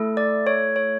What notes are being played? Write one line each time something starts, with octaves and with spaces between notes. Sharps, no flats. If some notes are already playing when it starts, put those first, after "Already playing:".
Already playing: A3 E4 A4
D5
C#5
C#5